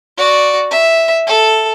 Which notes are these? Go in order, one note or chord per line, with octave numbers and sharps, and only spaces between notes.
F#4 D5
E5
A4